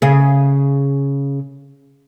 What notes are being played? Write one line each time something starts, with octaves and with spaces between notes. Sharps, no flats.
C#3 G#4